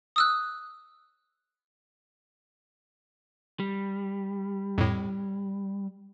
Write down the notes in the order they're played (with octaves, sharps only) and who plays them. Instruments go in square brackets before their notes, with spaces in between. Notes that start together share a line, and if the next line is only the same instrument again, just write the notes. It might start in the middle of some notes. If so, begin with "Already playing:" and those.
[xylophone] D#6 E6 F#6
[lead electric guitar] G3
[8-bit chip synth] F2 A2